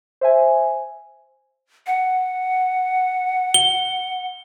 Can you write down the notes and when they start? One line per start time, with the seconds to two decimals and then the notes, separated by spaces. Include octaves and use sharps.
0.21 C5 E5 G#5
1.86 F#5
3.54 G7